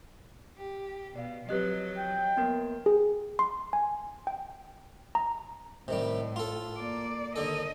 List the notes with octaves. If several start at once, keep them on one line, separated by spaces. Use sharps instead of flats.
G4
B2 D5 F5
F3 F#3 C4 G4 B4 D#5 F#6
G5
A#3 B3 A#4
G#4
C6
G#5
G5
A#5
A2 C3 D#3 G3
F4 A4
A#3 D5
D#2 D3 A4 D#5